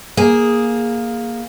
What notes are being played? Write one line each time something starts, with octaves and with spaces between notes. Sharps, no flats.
A#3 G#4